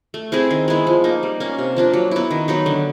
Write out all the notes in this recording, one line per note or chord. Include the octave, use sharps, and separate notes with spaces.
A3
C4 E4 G#4
D#3
G#3 B3 E4
F3
A#3 D#4
G3
A#3 C#4
C3
F3 A#3 D4
F#3
B3 E4
D#3
F#3 B3 D#4
D3